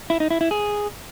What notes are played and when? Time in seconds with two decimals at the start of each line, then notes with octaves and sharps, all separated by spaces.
0.10 E4
0.20 D#4
0.30 E4
0.41 E4
0.51 G#4